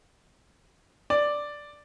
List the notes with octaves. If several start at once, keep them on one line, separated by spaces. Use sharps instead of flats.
D5